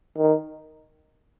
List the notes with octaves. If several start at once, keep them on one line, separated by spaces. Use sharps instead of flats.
D#3